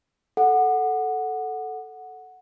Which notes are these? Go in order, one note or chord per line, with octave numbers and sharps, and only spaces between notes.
A4 F#5